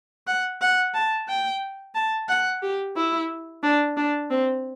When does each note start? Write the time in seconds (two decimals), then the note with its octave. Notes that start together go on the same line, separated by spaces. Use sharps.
0.27 F#5
0.61 F#5
0.94 A5
1.28 G5
1.95 A5
2.28 F#5
2.62 G4
2.96 E4
3.63 D4
3.97 D4
4.30 C4